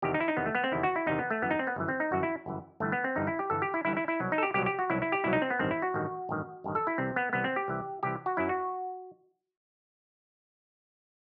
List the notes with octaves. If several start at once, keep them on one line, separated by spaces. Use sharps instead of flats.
E2 C3 D#3 G4
D#4
E4
D#4
E2 C3 D#3 B3
A3
B3
C4
E2 C3 D#3 E4
F#4
E4
E2 C3 D#3 D#4
B3
A3
G1 F#2 E3 B3
D#4
C4
B3
G1 F#2 E3
C4
D#4
G1 F#2 E3 F#4
E4
G1 F#2 E3
G1 G2 E3 A3
B3
C4
G1 G2 E3 D#4
E4
G4
G1 G2 E3 A4
G4
E4
G1 G2 E3 E4
E4
E4
C2 B2 F#3
D#4
A4
G4
C2 B2 F#3 G4
G4
F#4
C2 B2 F#3 E4
E4
G4
C2 B2 F#3 E4
D#4
C4
B3
A1 G2 D#3 C4
E4
F#4
A1 G2 D#3
A1 G2 D#3
A1 G2 D#3
A4
E4
C2 C3 E3 C4
B3
C2 C3 E3 B3
C4
G4
C2 C3 E3
C2 C3 E3 G4
F#4
F#2 F#3 E4
F#4